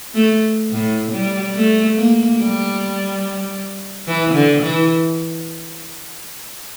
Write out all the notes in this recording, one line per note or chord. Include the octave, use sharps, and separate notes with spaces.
A3
A2
G3
A3
A#3
G3
E3
D3
E3